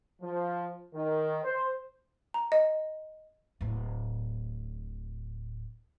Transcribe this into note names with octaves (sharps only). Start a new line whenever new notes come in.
F3
D#3
C5
A#5
D#5
D1 A2